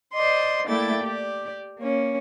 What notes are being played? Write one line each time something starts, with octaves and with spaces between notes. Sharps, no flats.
C5 D5 D#5 C6
A3 A#3 E4 D5 G5 A6
G4 D5
A#3 C#4